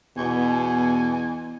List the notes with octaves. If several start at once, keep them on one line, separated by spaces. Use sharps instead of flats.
E2 B2 G#5